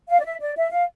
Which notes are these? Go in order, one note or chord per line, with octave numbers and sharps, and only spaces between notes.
F5
D5
E5
D5
E5
F5